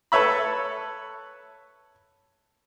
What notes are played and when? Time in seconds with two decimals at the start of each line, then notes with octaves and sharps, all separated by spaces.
0.12 A4 B4 C#5 E5 B5